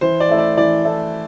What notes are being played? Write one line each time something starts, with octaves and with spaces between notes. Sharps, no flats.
E3 C5
D5
A3 E4 A4
D5
E3 D5
A3 E4 A4